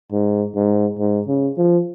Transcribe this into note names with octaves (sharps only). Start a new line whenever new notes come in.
G#2
G#2
G#2
C#3
F3